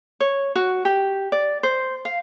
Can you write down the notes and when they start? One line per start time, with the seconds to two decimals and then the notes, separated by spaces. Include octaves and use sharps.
0.20 C#5
0.55 F#4
0.85 G4
1.32 D5
1.63 C5
2.05 F5